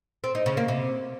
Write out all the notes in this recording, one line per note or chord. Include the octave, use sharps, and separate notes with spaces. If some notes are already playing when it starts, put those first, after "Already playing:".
C4
D#4
C#3
A#3
C3